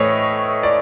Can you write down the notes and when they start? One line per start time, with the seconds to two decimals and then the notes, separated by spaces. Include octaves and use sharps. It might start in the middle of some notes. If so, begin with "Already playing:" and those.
Already playing: A2 E3 A3 C#5 D#5
0.63 D5